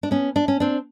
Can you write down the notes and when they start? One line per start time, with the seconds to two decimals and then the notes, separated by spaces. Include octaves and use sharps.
0.03 D4
0.11 B3 C#4
0.36 D4
0.48 C#4
0.60 C4 D4